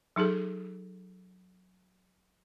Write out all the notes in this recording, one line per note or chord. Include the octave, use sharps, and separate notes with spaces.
F#3 D#4 G#4 A4